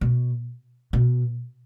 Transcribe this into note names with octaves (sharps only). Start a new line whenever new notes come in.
B2
B2